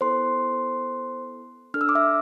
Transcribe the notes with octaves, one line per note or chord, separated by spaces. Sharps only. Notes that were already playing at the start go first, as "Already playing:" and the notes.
B3 E4 A4 C5 C6
D4 A4 F6
E6
D6
E5 E6